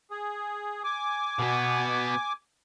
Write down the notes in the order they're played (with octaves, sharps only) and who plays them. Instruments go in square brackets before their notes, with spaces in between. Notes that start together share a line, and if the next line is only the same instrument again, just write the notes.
[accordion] G#4
G#5 D6
[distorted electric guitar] B2 B3